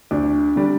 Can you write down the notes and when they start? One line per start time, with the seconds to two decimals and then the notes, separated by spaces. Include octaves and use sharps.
0.11 D2 D4
0.56 D3 G3